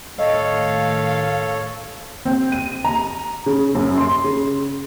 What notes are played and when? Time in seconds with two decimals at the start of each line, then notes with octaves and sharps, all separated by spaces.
0.19 A2 D#3 A4 C#5 D#5 F5
2.25 C4
2.52 D#7
2.84 A#5
3.46 C#3
3.75 F#2
3.98 C6
4.24 C#3